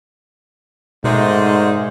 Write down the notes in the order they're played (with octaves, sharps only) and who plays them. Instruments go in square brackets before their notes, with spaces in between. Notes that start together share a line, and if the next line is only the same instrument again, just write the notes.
[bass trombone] G#2 [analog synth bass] B2 [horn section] D#3 F#3 G#3 [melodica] A3 C5 D5